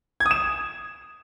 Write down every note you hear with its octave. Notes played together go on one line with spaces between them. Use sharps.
G#6
D#6
E7